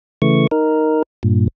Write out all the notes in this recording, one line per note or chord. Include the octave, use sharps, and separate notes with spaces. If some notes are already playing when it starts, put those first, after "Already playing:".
C#3 E3 A3 C#6
D#4 A#4
G2 A#2